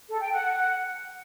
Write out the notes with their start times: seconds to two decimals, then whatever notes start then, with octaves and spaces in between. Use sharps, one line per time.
0.10 A4
0.21 G5
0.32 F#5